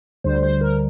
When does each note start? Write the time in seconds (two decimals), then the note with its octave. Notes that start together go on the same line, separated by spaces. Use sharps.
0.24 D2 D3 G3 C5
0.43 C5
0.61 A#4